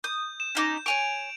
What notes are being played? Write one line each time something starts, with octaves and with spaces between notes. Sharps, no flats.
D#6 G6
E7
C#4 D#4 D6
C#5 G#5 C#6 D7 F7